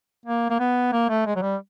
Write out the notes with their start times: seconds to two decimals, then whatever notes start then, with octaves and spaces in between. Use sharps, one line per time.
0.26 A#3
0.50 A#3
0.60 B3
0.93 A#3
1.10 A3
1.26 G#3
1.36 F#3
1.42 G3